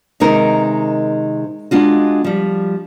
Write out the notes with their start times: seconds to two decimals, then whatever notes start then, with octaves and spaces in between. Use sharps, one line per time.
0.20 C3 D#3 G#3 D#4 A#4
1.71 G#3 D4 F4 F#4
2.24 F3 G3